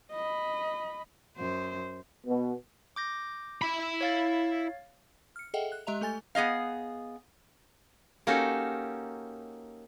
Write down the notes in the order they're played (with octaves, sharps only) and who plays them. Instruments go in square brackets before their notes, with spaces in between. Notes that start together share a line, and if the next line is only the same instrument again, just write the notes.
[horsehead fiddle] D#5 B5
[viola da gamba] F#2 C5
[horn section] B2
[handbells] D6 G6 A#6
[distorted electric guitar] E4 B5
[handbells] C#5 F5 A6
[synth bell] F6 C#7
G#4 A4 D#5 E5 F#5 G5
F#6
G#3 G4 D#5 E5 A#5 F7
A3 A4 G#5 A6
[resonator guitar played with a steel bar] B3 G#4 D#5 F5
[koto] A#3 C#4 D#4 F#4 G4 A4